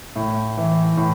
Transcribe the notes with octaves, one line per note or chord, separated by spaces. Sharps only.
A2
E3
A2